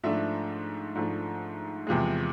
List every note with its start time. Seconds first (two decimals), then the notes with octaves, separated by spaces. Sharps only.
0.04 G#2 F3 A3 D4 E5
0.95 G#2 F3 A3 D4
1.87 E2 C3 F3 G#3